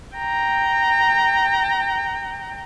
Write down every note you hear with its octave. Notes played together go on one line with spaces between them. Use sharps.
G5 A#5